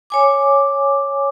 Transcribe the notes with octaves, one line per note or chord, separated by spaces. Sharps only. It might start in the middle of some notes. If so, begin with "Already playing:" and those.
C#5 G#5 D6